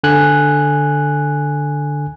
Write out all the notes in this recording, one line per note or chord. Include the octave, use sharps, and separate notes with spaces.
D3 G#5 F#6